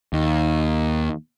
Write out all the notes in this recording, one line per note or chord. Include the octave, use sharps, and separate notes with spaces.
D#2